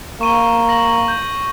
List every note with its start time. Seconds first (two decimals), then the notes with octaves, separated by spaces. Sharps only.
0.21 A#3 C#6 D#7 G7
0.69 A#6 F#7
1.08 G6